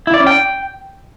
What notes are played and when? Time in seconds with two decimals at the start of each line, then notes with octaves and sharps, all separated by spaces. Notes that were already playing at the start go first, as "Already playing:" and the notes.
0.07 E4
0.14 D5
0.20 C#4
0.27 G5